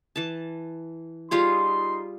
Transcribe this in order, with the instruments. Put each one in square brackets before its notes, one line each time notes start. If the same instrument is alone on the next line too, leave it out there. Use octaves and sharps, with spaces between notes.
[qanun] E3 A5
[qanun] G3 F4 G#4 [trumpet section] D#4 C6